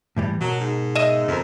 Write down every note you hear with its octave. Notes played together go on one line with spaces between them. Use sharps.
A2 E3 G3
B2 F#3 A#4
G#2
D#5 E5
F2 C3 A#4